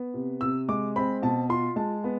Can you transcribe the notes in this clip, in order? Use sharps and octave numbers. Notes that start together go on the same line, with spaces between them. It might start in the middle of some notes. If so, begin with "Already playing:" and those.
Already playing: B3
C3
C3 E6
G#3 D6
C4 B5
B2 A5
F4 C6
G#3 A5
B3